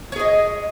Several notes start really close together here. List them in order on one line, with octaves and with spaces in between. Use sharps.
C#5 G#4 D#5